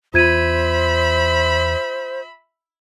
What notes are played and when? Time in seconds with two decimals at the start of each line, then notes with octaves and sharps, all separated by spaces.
0.14 E2 B3 F4 C5 E5 B5 G#6 D#7